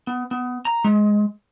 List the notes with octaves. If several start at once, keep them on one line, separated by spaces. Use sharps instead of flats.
B3
B3
A#5
G#3